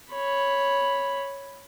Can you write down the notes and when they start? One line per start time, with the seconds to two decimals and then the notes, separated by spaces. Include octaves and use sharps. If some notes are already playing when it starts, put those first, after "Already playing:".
0.12 C#5 B5